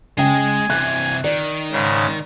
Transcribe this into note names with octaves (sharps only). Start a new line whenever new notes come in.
C#3 G#3 D#5 G5 G#5
C3 E3 F#6
D#3 D5
G#2 C#3